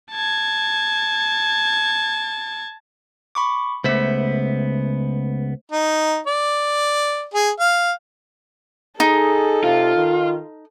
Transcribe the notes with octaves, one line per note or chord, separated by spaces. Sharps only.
A5 G#6
B5 C#6 D6
C#2 A3 B3 C5 E5
D#4
D5
G#4
F5
D#4 G#4 A4
C3 F4
D#3